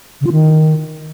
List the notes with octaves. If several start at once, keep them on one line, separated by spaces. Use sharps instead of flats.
C#3
F4
D#3